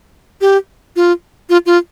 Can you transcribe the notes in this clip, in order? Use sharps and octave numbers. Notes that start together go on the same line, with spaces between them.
G4
F4
F4
F4